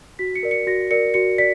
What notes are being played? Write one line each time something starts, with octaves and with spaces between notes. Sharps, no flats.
F#4 B6
C#7
A#4 D5
C#7
F#4 A#6
A#4 D5 C#7
F#4 C#7
D5 B6